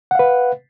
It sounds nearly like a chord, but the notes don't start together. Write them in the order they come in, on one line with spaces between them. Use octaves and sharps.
F#5 F5 B4